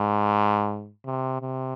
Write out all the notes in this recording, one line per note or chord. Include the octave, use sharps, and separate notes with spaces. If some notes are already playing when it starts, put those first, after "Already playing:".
Already playing: G#2
C3
C3